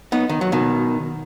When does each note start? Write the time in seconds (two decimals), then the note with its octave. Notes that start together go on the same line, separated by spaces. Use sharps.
0.12 B3 D#4
0.29 D#3
0.41 F#3
0.52 B2 D#3